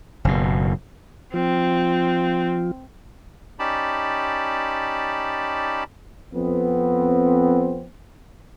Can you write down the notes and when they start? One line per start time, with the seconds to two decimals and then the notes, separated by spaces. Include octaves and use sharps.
0.25 F#1 B2
1.34 F3 C4 F4
3.59 C#4 D#4 G4 D5 A5 B5
6.33 F2 B3 C4